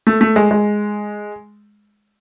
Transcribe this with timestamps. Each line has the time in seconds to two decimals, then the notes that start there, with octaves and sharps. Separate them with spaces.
0.07 A3
0.21 A3
0.36 G#3
0.51 G#3